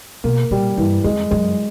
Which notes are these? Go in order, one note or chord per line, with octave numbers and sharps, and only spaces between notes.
B2 A#3
A#2 G3
G2 E3
F2 G#3
F#2 G#3